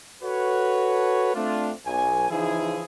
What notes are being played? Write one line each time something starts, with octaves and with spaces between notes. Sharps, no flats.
F#4 A4 B4 C#5
A3 C4 D4 F4
B1 G#5
C#3 E3 F3 D#4 E4 G#4